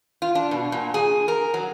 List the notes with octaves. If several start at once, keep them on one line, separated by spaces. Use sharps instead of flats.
F4
D4
B2
A#2
G#4
A#4
F#3